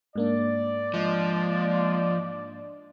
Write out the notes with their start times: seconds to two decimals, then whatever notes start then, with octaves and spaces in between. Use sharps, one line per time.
0.16 G#2 A#3 D4 D5
0.94 F3 G#3